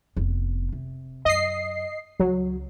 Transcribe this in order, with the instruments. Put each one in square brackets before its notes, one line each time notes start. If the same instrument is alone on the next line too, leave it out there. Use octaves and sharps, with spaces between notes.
[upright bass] F1 B3
C3
[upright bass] F#2 [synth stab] D#5 C7
[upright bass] C#2 [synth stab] F#3